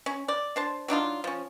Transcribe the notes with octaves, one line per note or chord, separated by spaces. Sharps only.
C#4
D5
D4 C5 A5
F#3 D4 D#4 F4
F3 C#4